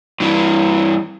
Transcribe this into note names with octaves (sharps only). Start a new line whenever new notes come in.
G2 E3